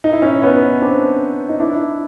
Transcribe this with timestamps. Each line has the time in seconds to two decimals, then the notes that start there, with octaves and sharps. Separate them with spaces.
0.04 D#4
0.12 E4
0.22 C#4 D#4
0.42 B3 C#4
0.81 C4 D4
1.49 D#4
1.60 D4 E4